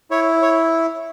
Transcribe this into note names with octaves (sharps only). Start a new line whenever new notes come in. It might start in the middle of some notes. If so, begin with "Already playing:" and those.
E4 C#5
C#5